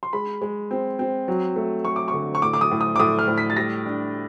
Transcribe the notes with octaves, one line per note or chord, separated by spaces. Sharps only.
C6
G#3 B5
G#3
C4
C4
F#3
A3
A3 C#6
D6
C#6
D3
C#6
A2 D6
D6
D#6
A2
D#6
D6
A2 D#6
F6
A2
B6
A6
G3 A#6
D4